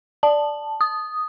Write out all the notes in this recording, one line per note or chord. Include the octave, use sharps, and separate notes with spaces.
D5 A5
D#6